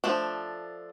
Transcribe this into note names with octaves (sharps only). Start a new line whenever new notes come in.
F3 A3 D4